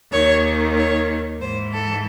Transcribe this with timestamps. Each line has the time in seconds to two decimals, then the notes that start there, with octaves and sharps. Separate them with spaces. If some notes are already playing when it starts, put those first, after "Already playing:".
0.12 D#2 D#3 C#5
0.77 C#5
1.40 G#2 E3 C5
1.73 A4